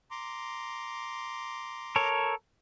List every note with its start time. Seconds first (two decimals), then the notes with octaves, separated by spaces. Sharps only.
0.11 A#5 C6 D6
1.96 A4 A#4 C#5